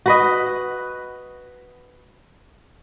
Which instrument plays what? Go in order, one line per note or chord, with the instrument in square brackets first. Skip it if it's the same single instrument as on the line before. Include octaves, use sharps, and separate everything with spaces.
[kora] F#4 B4 D#5